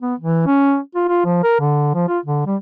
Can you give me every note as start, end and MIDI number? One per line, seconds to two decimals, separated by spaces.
0.01 0.15 59
0.20 0.44 52
0.46 0.79 61
0.95 1.06 65
1.08 1.20 65
1.25 1.39 53
1.43 1.59 70
1.60 1.94 50
1.94 2.08 53
2.08 2.19 65
2.25 2.43 50
2.46 2.56 55